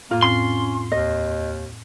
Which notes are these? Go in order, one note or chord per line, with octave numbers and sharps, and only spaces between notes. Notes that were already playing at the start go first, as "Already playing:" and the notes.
F2 A2 A#3 F4
C4 C#4 C6
D#2 D#5